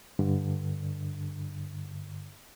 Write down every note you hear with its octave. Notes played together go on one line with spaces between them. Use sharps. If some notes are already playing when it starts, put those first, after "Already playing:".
G2 D3